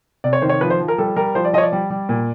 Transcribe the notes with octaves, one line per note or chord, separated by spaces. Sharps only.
C3 D5
C#5
D#3 C5
C#5
F3 B4
C5
F3
A#4
G3 A4
G3 A#4
F3 C5
D5
F3 C#5 D#5
D5
G3
G3
A#2